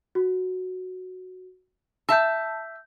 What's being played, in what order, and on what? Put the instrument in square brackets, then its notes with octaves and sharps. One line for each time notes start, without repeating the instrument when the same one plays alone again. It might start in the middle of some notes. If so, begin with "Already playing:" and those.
[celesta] F#4
[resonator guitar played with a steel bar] E5 A5 [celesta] E6 G6